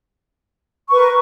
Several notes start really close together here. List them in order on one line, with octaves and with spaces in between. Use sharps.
C#6 B4 A#4